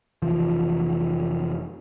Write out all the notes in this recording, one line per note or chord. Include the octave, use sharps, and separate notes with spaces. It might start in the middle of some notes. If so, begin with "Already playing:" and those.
F1 E3 F3